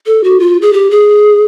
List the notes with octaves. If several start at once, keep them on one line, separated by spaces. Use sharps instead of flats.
A4
F#4
F4
G#4
G4
G#4